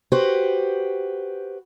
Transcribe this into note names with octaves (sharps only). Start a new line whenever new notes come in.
F#4 G4 B4 C5